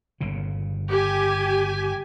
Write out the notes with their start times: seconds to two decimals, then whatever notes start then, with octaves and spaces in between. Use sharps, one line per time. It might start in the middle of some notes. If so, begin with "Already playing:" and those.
0.21 G1 A#2 C#3
0.89 G4 G#5